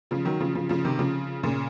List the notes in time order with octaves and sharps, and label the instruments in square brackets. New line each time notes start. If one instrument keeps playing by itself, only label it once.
[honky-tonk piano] C#3 F3
D#3 F#3
C#3 F3
C#3 F3
C#3 F3
C3 D#3
C#3 F3
A#2 C#3